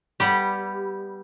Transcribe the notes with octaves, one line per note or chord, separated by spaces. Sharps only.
G3 B3 G4